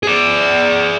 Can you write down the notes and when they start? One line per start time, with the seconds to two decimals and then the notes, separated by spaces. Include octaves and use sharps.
0.03 G#4 D5